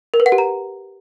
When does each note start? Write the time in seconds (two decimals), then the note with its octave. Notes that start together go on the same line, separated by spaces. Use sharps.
0.14 A#4
0.20 B4
0.26 F#5
0.32 G4
0.38 A#5